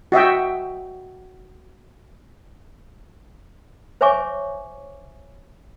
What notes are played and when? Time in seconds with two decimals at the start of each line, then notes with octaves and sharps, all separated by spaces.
0.12 F#4 D#5 E5 G5
4.01 C5 C#5 E5 G#5 C#6 D6